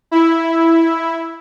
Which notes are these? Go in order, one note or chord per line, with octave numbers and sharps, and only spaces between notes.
E4